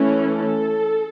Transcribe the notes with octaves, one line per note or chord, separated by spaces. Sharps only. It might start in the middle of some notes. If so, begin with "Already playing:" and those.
Already playing: E3 A3 C#4
A4